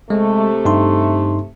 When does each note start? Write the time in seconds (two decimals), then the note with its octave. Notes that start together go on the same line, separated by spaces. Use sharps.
0.10 C3 G#3 A3
0.65 G2 D#4 C6